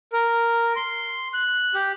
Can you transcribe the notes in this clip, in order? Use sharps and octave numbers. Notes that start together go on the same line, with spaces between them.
A#4
C6
F#6
G4